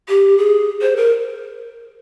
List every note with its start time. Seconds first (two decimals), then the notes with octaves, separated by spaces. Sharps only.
0.09 G4
0.38 G#4
0.82 C5
0.97 A#4